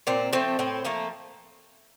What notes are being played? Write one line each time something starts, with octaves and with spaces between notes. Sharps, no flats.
A#2 C4
F3 A3 C4
A2 C4
F3 A3 A#3